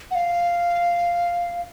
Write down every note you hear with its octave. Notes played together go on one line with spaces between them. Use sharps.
F#5
F5